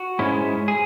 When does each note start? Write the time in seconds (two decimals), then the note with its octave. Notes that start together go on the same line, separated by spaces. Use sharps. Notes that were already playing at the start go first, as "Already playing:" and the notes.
Already playing: F#4
0.19 G#2 G#3 C#4 E4
0.68 G#4